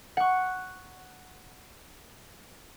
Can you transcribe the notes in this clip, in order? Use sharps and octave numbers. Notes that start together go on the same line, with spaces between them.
F#5 C#6